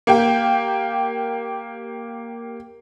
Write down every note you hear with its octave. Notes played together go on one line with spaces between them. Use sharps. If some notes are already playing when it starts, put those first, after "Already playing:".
A#3 G4 G5